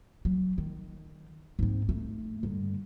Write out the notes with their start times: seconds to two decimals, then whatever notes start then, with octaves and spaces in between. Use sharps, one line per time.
0.25 F#3
0.58 D#3
1.59 G#2 C4
1.89 A3
2.43 G2 D3